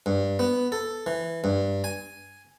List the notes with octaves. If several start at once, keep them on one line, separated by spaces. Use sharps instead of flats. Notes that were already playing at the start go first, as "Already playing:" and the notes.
G2
B3
A4
E3
G2
G#5